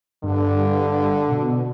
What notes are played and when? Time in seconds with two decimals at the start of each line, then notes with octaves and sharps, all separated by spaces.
0.24 G2 D3
1.30 B2